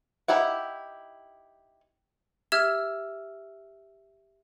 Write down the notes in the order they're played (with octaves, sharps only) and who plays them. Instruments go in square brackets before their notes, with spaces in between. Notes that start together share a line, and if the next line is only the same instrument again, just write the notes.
[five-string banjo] D#4 E4 G4 F#5
[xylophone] G4 E5 E6 F6 G#6